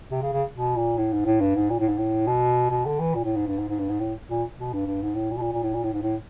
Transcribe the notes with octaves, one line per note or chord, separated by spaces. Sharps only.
C3
C#3
C#3
B2
A#2
A2
G#2
A2
G2
G#2
A#2
A2
G#2
A2
B2
B2
D3
E3
A#2
A2
G#2
G2
G#2
G#2
G2
G#2
A2
A#2
B2
G2
G2
G#2
A2
A#2
B2
A#2
A#2
A2
A#2
A2
G#2
A2